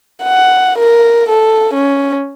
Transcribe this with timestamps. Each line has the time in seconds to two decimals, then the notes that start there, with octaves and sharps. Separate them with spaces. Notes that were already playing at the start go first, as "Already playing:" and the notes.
0.23 F#5
0.79 A#4
1.29 A4
1.74 C#4